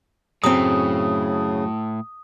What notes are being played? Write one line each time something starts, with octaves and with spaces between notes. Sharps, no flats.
F#2 A2 C#3 C4 D#6